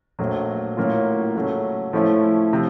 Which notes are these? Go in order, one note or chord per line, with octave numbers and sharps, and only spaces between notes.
A#1 A#2 F#3 A3
A2 F#3 A#3 C#4 F4
C#3 F#3 A3 C#4
A2 F3 A3 C#4 E4
C3 F3